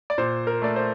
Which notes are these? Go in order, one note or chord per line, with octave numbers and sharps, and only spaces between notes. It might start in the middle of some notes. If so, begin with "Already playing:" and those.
D5
A#2 C5
A#4
A3 D5
C5